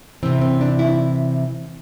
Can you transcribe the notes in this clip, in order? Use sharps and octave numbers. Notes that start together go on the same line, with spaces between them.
C3 E3 C4
C4
D4
E4